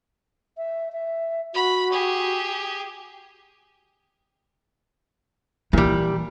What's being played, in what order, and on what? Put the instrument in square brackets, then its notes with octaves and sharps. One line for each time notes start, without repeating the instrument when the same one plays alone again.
[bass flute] E5
E5
[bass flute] F#4 [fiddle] B5
[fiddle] G4 G#4
[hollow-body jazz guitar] A#2 G3 [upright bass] E3